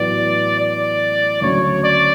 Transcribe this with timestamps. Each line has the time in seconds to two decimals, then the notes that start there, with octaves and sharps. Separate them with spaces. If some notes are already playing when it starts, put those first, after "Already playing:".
Already playing: A1 A2 F#3 B3 D5
0.60 D5
1.41 D2 C#3 F#3 C#5
1.84 D5